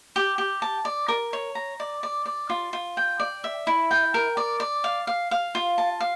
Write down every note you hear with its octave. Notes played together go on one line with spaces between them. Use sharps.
G4
G4
A5
D5
A#4
C#5
A#5
D5
D5
D5
F4
F4
G5
D5
E5
E4
G5
A#4
D5
D5
F5
F5
F5
F4
A5
F5